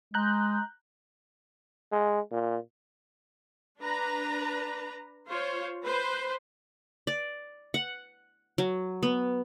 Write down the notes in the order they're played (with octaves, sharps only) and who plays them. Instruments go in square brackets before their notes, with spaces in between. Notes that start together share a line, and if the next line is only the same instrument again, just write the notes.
[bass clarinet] G#3 [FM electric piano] A#5 F#6 G6
[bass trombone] G#3
A#2
[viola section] D4 B4 A#5
F4 C5 C#5
B4 C5
[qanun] D5
F#5
F#3
B3